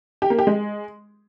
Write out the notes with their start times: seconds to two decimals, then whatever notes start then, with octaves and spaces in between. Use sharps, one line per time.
0.22 G4
0.30 A#3
0.39 G4
0.47 G#3